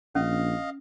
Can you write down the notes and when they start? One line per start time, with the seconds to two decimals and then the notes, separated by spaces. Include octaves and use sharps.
0.15 A#1 C#4 D#5 F5